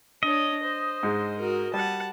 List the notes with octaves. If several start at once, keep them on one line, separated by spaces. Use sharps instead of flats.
D4 C#5 D#5
C5
G#2 G#3
F#4 A#4
G3 F#5 A5